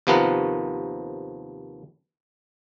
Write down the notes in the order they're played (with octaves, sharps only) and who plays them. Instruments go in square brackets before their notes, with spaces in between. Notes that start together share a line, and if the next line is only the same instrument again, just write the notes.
[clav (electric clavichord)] D#2 C3 F3 B3 A#4 F#5